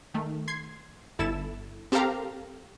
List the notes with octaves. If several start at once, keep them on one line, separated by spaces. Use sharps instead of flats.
D#3 A3
C6 G#6 C7
G1 E4 A4 A6 E7
C4 G4 A4 A#4 F5 A#5